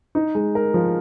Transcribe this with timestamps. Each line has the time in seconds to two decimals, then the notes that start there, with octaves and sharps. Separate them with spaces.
0.15 D#4
0.35 G#3
0.55 A#4
0.74 F3